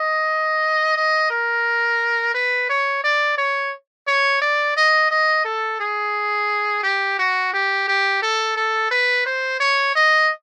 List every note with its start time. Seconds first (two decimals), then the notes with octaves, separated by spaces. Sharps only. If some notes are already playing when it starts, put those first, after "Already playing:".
Already playing: D#5
0.96 D#5
1.30 A#4
2.35 B4
2.70 C#5
3.04 D5
3.38 C#5
4.08 C#5
4.42 D5
4.77 D#5
5.11 D#5
5.45 A4
5.80 G#4
6.83 G4
7.19 F#4
7.54 G4
7.88 G4
8.23 A4
8.57 A4
8.91 B4
9.26 C5
9.60 C#5
9.95 D#5